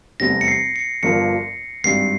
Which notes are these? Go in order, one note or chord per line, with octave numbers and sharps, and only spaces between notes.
F1 E2 C3 G3 C4 A#6
C#7
C7
C#7
G1 G2 F3 A#3 F4 C#7
G#1 G2 G3 C7